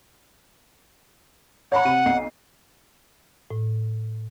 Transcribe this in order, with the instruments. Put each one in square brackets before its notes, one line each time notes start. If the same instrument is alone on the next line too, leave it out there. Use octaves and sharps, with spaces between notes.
[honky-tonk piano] C#5 A#5 B5 [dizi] F#5
[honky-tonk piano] C3 D#7
B1 C7
[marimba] A2